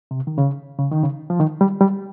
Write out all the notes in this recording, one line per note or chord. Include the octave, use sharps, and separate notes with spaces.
C3
D#3
C#3
C#3
D#3
C#3
F3
D#3
G3
G3